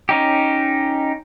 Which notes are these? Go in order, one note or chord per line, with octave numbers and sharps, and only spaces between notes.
C#4 D#4 G4